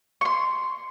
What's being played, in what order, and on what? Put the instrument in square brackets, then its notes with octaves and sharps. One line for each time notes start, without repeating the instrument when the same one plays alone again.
[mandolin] C6 C#6